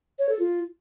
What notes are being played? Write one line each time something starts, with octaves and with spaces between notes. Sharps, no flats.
C#5
A4
F4